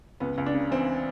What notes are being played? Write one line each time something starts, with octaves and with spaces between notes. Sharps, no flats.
C#2 B3
C#2
D4
C#3
E3 C4